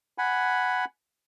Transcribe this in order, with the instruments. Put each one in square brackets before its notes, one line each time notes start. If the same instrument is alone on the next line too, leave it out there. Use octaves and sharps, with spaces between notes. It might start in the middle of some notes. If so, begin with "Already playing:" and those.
[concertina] F#5 G#5 B5